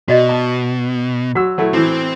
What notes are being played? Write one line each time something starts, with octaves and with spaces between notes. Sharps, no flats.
B2 F#4 D5 D#5
A5
F#3 F#4 E6
F#3 A3 E4
A2 E3 C4